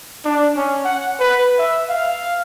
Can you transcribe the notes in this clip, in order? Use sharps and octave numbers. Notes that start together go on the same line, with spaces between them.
D4
C#4
F#5
B4
E5
F5